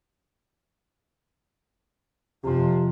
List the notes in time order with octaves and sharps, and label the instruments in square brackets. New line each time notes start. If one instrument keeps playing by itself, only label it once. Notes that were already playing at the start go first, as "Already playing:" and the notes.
[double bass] F2 F3 [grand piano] C3 C6